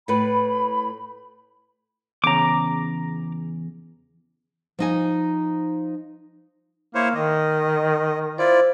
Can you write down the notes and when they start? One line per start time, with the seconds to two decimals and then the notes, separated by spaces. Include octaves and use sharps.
0.08 A2 B4 B5
2.24 E2 C#3 A#5 D6
4.79 F3 D#4 G#5
6.95 A#3 E4 C5 C#5
7.15 D#3 D#5
8.38 E4 F4 C5 D5